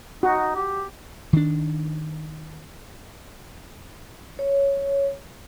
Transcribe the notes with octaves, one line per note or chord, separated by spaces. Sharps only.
D#4 F#4
G4
D#3 D4
C#5